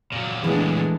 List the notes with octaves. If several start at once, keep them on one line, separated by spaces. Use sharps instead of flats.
A#2 F#3
E3 G#3 A3 B3 D4